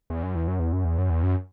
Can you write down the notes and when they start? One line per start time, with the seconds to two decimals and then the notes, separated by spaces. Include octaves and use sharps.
0.10 E2
0.23 F#2
0.35 E2
0.48 F#2
0.59 E2
0.73 F#2
0.84 E2
0.98 F#2
1.10 E2
1.23 F#2